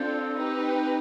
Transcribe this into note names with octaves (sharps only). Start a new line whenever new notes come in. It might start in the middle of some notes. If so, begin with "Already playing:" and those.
Already playing: C4 D4 F4 A4
D#4 G4 B4